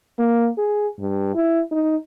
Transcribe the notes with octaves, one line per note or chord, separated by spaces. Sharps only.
A#3
G#4
G2
E4
D#4